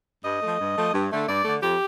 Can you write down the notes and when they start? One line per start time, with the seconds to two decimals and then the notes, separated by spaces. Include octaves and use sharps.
0.24 G2 D#5
0.42 F3 A3
0.60 G2
0.76 F3 A3
0.94 G2
1.11 D3 A3
1.28 G2 D5
1.45 D3 A3
1.62 F2 G4